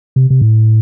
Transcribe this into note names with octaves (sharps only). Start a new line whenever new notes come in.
C3
C3
A2